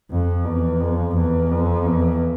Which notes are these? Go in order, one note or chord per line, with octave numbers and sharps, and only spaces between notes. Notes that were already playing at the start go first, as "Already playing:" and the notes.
F2
E2
F2
E2
F2
E2